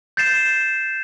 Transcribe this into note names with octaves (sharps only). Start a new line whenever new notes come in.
G6 A6 C7 E7